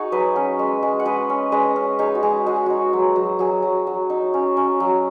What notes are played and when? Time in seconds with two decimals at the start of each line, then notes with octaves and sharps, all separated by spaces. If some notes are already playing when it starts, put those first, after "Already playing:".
Already playing: D#4 F#4 G#4 C#5 F#5
0.12 F#3 B4 D#5
0.36 C#4
0.59 G#3
0.83 G#3
0.99 F#5
1.05 G#3 B4 D#5
1.29 C#4
1.52 G#3 B4 D#5
1.76 C#4
1.99 D#4 G#4 C#5
2.15 F#4
2.23 G#3 G#4
2.46 G#3 F#4
2.56 G#4
2.66 D#4 F#4
2.93 F#3
3.16 F#3
3.39 F#3 G#4
3.63 F#3
3.87 F#3
4.10 D#4
4.34 C#4
4.57 C#4
4.80 F#3